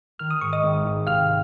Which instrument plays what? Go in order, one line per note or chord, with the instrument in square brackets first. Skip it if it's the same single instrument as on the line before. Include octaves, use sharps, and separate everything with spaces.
[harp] D#3 [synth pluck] F6
[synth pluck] D#6
[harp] G#2 [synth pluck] C#6
[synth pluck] D#5 D#6
[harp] G#1
G#2
[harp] C3 [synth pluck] F5 F6